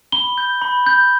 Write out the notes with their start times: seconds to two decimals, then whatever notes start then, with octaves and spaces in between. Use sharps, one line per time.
0.12 B5 G7
0.38 G6
0.62 B5
0.86 G6